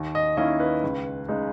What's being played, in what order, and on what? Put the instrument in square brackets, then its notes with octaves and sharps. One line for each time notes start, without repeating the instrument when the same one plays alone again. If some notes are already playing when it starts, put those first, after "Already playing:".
Already playing: [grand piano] D#2
D#5
D#3 A#3 C#4 E4 D#5
B4
C#2
C#3 G#3 D#4